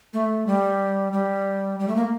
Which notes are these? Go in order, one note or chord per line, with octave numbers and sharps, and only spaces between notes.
A3
G3
G3
G3
A3
A#3